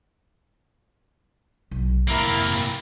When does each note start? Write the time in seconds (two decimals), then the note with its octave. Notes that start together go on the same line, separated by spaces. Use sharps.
1.71 B1
2.08 F2 C3 A#3 E4 A#4